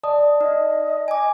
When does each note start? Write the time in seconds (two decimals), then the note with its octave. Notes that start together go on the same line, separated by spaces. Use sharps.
0.03 D5 D#5 A5 D#6
0.41 D#4 D#5
1.08 G#5 D6